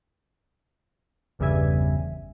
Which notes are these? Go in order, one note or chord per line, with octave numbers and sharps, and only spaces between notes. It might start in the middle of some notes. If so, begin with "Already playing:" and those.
G1 E2 C#3 G3 E5 G#5